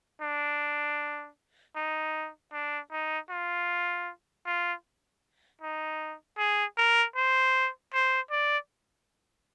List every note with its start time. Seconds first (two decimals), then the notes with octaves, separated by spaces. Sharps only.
0.21 D4
1.76 D#4
2.52 D4
2.92 D#4
3.30 F4
4.46 F4
5.61 D#4
6.38 G#4
6.78 A#4
7.16 C5
7.93 C5
8.31 D5